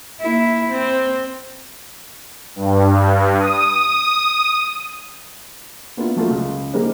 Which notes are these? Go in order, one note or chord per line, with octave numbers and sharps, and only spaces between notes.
A#3 E4
C4
G2
D#6
A#3 B3 D4 E4 F4
F3 F#3 A3 A#3 C#4 F4
C#2
F3 G3 A#3 D#4 G#4 C5